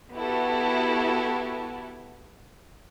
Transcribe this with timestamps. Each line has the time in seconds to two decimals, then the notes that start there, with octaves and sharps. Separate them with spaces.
0.14 B3 E4 F#4 G4 A4